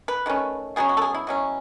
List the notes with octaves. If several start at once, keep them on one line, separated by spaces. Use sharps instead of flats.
B4
D#3 A3 C#4
B2 F#3 C#4 G#4
F#4
A4
G#4
E4
B2 F#3 C#4